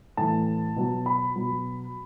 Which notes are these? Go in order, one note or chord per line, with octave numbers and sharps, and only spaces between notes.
A2 E3 A5
B2 F#3
B5
B2 F#3